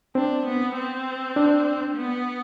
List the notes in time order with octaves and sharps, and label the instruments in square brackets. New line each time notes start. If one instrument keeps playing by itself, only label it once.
[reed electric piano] C4 [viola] D4
[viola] B3
C4
[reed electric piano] D4
[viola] B3